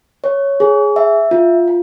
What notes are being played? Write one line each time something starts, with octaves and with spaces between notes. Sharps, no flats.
C#5
G#4
E5
F4
F4